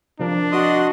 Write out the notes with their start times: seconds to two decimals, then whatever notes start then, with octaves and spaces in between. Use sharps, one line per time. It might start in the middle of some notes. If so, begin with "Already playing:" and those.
0.20 C3 F3 D4 A#4
0.52 F#4 D#5 C6 D#6